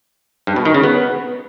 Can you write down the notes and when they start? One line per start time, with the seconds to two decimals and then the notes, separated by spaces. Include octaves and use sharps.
0.47 G2
0.56 B2
0.65 D#3
0.74 C#3
0.84 B3